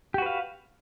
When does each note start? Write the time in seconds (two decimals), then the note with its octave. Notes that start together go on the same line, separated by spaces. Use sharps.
0.14 G4
0.18 F#4
0.22 B4
0.26 F5